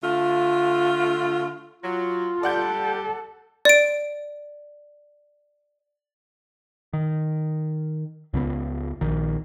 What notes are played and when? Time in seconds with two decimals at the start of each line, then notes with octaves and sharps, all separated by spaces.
0.02 D3 A3 F4
1.82 F#3 F4
2.43 G3 D4 G4 A4 D5 F#5 G6
3.65 D5 D7
6.93 D#3
8.34 C#2 C#3 G3 B3
9.01 A#1 D#3